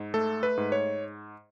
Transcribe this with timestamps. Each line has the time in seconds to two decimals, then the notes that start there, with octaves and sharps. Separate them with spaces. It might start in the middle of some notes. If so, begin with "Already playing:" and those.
Already playing: G#2
0.14 A3 A4
0.43 B4
0.57 G#2
0.72 C#5